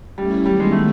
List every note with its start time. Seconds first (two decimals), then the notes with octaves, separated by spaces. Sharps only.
0.17 G3 A3 C#4 E4
0.46 D#3 F#3 G3 B3
0.60 G#3
0.72 A3